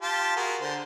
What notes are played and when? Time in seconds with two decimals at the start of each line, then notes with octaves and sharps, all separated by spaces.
0.02 F4 G4 A5
0.36 F#4 G#4 A#4
0.61 D3 C5